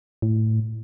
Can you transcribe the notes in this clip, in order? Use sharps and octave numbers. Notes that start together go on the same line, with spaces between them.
A2